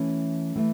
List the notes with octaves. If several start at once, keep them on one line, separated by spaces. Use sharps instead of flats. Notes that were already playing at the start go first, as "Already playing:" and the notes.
Already playing: E3 A3 C#4 A4
E3 A3